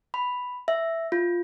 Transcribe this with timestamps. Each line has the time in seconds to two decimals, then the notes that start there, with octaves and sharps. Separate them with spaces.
0.14 B5
0.68 E5
1.12 F4